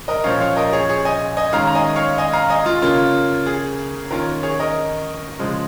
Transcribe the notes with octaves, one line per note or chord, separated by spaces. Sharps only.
A#4 D#5
A#2 F3 C#4 C#5 F5
C#5 F5
A#4 D#5
G#4 C#5
G#4 C#5
D#5 G#5
D#5 G#5
D#3 G#3 C#4 F5 A#5
A#5
D#5 G#5
C#5 F5
D#5 G#5
F5 A#5
D#5 G#5
F4
C#3 A#3 C#4 F4
G#4
D#3 A#3 C#4 F4 A#4
G#4 C#5
A#4 D#5
C#3 F3 G#3